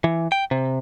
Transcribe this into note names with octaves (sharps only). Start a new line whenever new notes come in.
E3
G5
C3